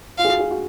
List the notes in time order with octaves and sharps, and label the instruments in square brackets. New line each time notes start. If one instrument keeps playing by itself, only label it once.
[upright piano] F4 [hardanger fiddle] F5
[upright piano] G#4
F#4
G#4
F#4